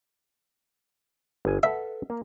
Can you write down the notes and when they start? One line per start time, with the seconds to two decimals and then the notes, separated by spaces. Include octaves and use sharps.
1.45 G1 G#5
1.63 A4 B4 E5 F#5
2.10 A#3